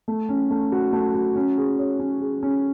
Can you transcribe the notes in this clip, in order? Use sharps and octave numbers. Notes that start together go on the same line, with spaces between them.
A3
C#4
A3
F#4
A3
F#4
C#4
G#4
C#5
C#4
G#4
C#4